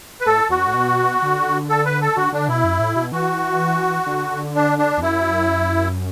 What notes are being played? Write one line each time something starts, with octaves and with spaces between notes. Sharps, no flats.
B4
A2 A4
E2 F#4
F#2
A2
B2
D3
A4
B4
A4
D3 F#4
D3 D4
B2 E4
F#2
A2
B2
E3 F#4
D3
D4
D4
E2
F#2 E4